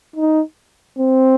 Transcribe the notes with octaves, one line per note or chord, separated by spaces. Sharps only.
D#4
C4